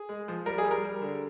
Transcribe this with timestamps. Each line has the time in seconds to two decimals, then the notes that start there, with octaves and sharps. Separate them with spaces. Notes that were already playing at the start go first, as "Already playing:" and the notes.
Already playing: G#4
0.09 G#3
0.28 F3
0.46 G3 A#4
0.58 G#4
0.64 G3
0.71 A#4
0.84 G3
1.02 D3